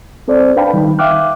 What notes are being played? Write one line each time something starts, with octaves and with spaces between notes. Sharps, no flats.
C4 A4 C5 D5
D4 B4 F5 G5 A5 B5
D#3 G3 D#4
E5 F5 G5 D6 F6 F#6